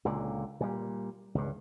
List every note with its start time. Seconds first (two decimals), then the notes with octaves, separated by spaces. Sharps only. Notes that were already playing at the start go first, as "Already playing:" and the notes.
0.05 C#2 A#2 D3
0.60 A#2 G3
1.35 C#2 G2